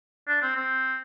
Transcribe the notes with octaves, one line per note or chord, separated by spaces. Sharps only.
D4
C4
C4